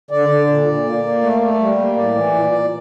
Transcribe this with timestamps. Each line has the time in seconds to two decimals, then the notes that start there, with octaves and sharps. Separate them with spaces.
0.11 D3 D5
0.29 D3
0.48 A#2
0.67 A#2
0.85 A#3
1.03 A#3
1.23 A3
1.41 A3
1.59 G3
1.78 A#3
1.96 A2 D5
2.14 E3
2.34 A#2
2.52 A#2